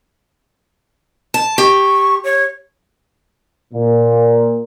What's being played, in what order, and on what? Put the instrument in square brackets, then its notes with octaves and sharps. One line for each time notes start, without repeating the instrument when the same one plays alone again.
[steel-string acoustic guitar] A5
[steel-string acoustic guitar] G4 [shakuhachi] C#6
[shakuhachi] C#5
[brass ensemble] A#2